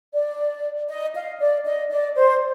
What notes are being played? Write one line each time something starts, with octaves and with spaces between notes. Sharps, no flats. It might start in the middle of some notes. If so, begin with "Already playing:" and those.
D5
D#5
F5
D5
D#5
D5
C5